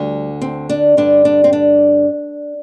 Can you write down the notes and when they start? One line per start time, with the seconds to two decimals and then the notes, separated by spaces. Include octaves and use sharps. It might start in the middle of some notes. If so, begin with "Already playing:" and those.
Already playing: D2 D3 G3
0.42 C4
0.69 D4
0.97 G2 D3 D4
1.25 D4
1.44 C4
1.53 D4